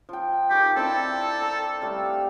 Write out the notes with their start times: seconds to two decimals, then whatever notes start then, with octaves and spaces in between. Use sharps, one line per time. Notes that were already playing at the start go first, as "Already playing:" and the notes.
0.09 F3 G5
0.50 D#3 G4 C#6
0.76 C4 D4 E4 A4
1.42 A#5
1.82 G3 A3 F5